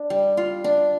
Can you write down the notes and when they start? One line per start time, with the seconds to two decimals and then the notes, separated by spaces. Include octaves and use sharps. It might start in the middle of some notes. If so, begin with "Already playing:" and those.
Already playing: D4
0.10 G3
0.37 F4
0.64 D4